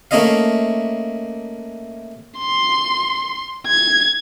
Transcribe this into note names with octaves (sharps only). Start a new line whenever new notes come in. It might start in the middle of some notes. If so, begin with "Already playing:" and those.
A3 A#3 C#4 E4 D#5 F5
C6
G#6